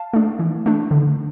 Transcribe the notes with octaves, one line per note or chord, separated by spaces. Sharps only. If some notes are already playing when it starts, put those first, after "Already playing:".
Already playing: F5 A5
A3 D4
E3
A3 D4
D3